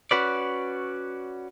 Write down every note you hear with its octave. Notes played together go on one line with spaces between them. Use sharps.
C#4 F#4 B4 D5